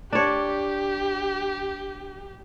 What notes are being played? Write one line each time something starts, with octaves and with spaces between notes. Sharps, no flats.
D4 G4 C#5